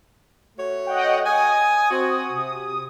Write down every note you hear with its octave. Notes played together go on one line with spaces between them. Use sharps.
A3 F#4 C#5
D#5 F#5 G5
G#5 D#6
C4 F#4
C3